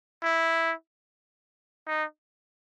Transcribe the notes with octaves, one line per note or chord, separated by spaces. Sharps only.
E4
D#4